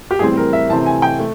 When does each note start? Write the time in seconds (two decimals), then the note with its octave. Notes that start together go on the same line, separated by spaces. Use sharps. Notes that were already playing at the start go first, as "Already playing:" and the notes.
0.11 G4
0.19 A2 E3 G3 C4 G#4
0.37 A#4
0.53 E5
0.69 C3 E3 A3 C4 A5
0.86 G#5
1.02 G5
1.19 A3